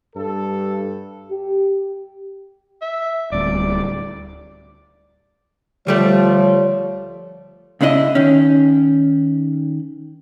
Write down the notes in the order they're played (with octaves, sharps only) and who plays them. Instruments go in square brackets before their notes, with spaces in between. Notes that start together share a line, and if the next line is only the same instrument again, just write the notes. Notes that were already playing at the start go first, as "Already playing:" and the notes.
[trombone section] G2 A4
[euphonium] G4
[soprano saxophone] E5
[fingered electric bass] D1 D2 G3 [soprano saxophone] D5
[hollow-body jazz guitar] D2 G3 A3 [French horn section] F3 C#5
[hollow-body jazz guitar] C#2 C#3 D4 E4 D#5
D#3 C#4